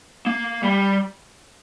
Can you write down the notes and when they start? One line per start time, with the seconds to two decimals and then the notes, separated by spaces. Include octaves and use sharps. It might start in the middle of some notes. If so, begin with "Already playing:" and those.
0.27 A#3
0.63 G3